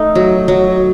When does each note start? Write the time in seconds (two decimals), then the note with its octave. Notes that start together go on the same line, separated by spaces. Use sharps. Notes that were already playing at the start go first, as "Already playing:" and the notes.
Already playing: A3 D#4
0.15 F#3
0.48 F#3